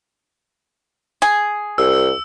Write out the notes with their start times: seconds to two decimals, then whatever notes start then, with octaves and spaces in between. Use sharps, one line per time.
1.22 G#4
1.78 C2 E6